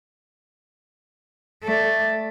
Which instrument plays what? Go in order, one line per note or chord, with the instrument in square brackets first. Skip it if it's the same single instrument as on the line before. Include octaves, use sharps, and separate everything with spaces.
[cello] A3 D5